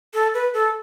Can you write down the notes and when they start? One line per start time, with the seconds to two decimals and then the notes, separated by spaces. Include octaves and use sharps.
0.14 A4
0.34 B4
0.54 A4